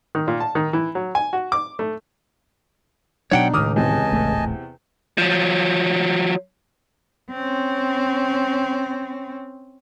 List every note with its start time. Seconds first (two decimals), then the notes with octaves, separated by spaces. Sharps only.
0.15 D#3
0.28 A#2
0.40 A5
0.55 D#3
0.73 E3
0.95 F#3
1.15 G#5
1.33 F#4
1.52 D6
1.79 A3
3.31 B2 F#3 D4 D#4 C#5 F#5 G5
3.54 C#2 A2 D#3 D6 D#6 F6
3.76 E2 C3 D#5 G#5 A5
4.12 D#1 A1 A3
5.18 F3 F#3
7.31 C4 C#4